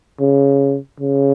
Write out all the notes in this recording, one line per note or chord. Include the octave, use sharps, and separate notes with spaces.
C#3
C#3